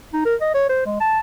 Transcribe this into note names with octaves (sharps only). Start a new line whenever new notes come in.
D#4
A#4
D#5
C#5
C5
G#3
A5